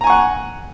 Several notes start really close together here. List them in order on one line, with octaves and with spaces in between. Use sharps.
A#5 G#5 C#6 F#5